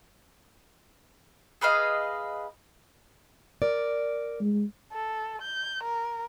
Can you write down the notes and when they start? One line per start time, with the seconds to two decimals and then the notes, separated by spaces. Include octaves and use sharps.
1.61 G#4 B4 D#5 F5
3.62 A#4 D5
4.40 G#3
4.93 A4
5.41 G6
5.83 A#4